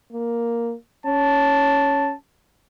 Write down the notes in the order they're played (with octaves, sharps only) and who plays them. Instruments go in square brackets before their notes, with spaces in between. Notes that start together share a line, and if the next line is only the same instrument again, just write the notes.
[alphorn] A#3
[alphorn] C#4 [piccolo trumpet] A5